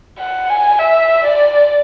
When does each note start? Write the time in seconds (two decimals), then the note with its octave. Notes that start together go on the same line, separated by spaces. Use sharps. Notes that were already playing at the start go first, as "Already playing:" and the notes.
0.19 F#5
0.50 G#5
0.79 E5
1.24 D5